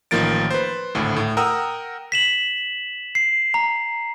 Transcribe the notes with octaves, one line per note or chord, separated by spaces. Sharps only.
A1 D#3 F3 A#3 A6 D7
B4 C5
G#1 D2 A2
A2
A#4 F#5 G5 A#5 D#6 E6
B6 E7 F#7
C7
A#5